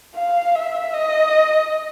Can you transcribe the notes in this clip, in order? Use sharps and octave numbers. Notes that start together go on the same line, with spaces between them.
F5
E5
D#5